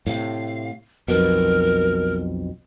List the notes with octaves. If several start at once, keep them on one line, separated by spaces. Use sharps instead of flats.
A2 C3 F5
B1 F2 B2 A#4